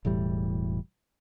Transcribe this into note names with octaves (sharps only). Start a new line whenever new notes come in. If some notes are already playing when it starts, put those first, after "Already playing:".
E1 A2 E3 G3